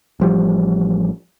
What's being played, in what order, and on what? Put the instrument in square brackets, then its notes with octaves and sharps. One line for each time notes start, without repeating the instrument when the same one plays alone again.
[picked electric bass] A1 F3 G3